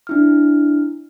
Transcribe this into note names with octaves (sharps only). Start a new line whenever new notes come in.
D4 E4 F6